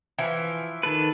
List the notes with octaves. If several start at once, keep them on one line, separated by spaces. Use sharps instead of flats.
E3 F3
D#3 A4 B4